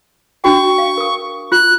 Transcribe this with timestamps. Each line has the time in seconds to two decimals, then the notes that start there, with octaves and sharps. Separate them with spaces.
0.44 D4 F#4 G5 C#6
0.78 F5
0.98 A#4 D#6
1.52 F4 F#6